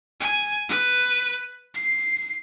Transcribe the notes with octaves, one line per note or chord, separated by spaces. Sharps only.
G#5
B4
C7